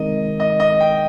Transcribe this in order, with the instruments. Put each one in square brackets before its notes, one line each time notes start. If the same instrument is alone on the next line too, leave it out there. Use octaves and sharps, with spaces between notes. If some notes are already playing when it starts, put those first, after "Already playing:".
Already playing: [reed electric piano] D#3 G#3 C4 D#4 A#4 [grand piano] D#5
[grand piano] D#5
D#5
G5